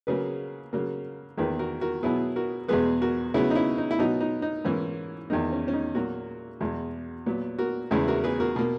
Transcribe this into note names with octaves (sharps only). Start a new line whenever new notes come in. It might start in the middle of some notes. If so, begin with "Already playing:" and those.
C#3 F#3 A#3 G#4 B4
C#3 F#3 A#3
E2 D#3 A#3 G#4 B4
F#4 A#4
F#4 A#4
B2 F#3 B3 E4 G#4
F#4 A#4
E2 B2 G#3 B3 G#4 B4
F#4 A#4
C#3 F#3 B3 E4 G#4
D#4
C#4 E4
D#4
E4
B2 F#3 B3 D#4
D#4
D#4
G#2 E3 A#3 C#4
E2 D#3 A#3 D#4
C#4
C#4
D#4
A#2 F#3 A#3 F#4 A#4
E2 B2 G#3
A#2 F#3 B3
F#4 A#4
E2 C#3 G#3 B3 E4 G#4
F#4 A#4
G#4 B4
F#4 A#4
B2 A#3